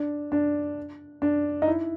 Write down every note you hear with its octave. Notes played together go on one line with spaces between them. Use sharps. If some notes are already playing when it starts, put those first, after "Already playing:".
Already playing: D4
D4
D4
D#4
E4